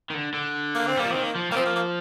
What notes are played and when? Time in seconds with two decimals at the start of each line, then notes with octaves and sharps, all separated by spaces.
0.10 D#3
0.14 D3
0.34 D3
0.75 A#3
0.87 C4
0.97 G3 A#3
1.06 F3
1.11 D#3 C4
1.23 A#3
1.36 F3
1.51 G3 A#3
1.56 F3 C4
1.66 A#3
1.76 A#3